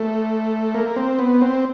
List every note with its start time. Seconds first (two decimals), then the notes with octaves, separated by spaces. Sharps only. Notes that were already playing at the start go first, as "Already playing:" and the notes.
Already playing: A3
0.74 A#3
0.96 C4
1.19 B3
1.41 C4